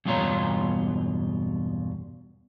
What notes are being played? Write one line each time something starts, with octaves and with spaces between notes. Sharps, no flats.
E2 G2 B2 F4 C#5 A#5